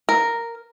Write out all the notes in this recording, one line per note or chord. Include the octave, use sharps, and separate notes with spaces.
A#4